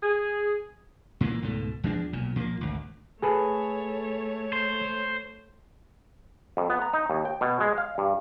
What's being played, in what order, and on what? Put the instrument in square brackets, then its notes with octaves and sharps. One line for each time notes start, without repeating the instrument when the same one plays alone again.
[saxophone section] G#4
[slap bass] A#2 E3 F#3 A#3
C#2 G#2 B2 A3
E2 F3 G#3 D4
B1 A#2
A#2 F3 A3 A#3
G#1 D2
[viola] A3 C#5 [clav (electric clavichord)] G#4 A4 B4
[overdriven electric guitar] C5
[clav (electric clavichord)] F2
B3
A#5
D#4
D#2
G5
B2
G#3
F5
G2